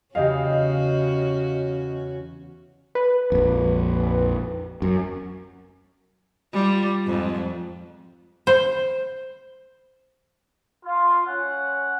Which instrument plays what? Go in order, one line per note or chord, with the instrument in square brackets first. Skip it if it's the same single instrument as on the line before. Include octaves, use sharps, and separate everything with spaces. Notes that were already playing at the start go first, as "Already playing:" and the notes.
[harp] E2 C#3 [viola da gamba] C#4 F#4 [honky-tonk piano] G4 D#5 F5
[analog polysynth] B4
[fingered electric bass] A#1 F2
F#2
[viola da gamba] G3 F4
F2 G#2
[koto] C5
[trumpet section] F4
C#4 F#5